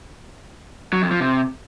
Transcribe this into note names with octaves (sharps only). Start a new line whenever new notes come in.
F#3
F2
F3
C3